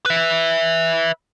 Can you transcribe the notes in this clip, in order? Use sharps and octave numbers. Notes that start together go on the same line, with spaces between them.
B4 E5